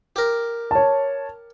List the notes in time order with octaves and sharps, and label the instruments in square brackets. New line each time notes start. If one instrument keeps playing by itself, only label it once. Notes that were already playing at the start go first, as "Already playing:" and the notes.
[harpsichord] G4 A#4
[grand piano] C#5 A5